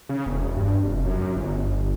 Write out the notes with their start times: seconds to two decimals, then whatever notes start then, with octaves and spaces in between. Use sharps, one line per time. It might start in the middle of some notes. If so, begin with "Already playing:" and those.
0.09 C#3
0.26 E1
0.57 G2
0.83 F1
1.05 F#2
1.36 G1